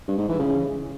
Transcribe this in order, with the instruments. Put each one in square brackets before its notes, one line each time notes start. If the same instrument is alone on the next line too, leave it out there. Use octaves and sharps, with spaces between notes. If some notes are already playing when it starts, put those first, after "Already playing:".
[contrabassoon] G2
G#2
E3
C#3